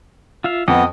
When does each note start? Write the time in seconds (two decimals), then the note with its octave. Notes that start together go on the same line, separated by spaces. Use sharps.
0.44 F4 E5 F5
0.68 F2 B3 D#5